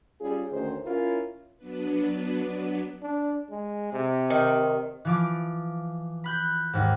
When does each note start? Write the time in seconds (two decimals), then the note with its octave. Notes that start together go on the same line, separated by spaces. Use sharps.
0.21 G3 C#4 F4 G#4
0.51 D2 D#3 A3 C#4 C5
0.85 C#4 E4 F4 A#4
1.57 F#3 B3 D4 B4
3.02 D4
3.50 G#3
3.92 C3
4.30 D#3
5.05 E3 F3 D6
6.24 B5 F#6 G6
6.73 D#2 G#2